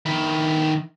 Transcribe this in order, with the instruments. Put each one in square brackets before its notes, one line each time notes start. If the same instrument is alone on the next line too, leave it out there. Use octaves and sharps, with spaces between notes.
[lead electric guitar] D#3 E4